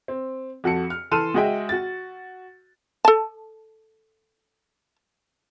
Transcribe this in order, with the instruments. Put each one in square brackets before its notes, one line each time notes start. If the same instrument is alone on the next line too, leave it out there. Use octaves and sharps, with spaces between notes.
[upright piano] C4
F2 F#4 A4 C#7
F6
E3 A4 C6 F6 D#7 E7
G#3 F#4 G#4 D#5 E5 G5
F#4 A6
[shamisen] A4 A5